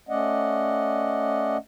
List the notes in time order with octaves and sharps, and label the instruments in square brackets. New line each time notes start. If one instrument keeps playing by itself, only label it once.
[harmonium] A3 C#4 D5 D#5 F#5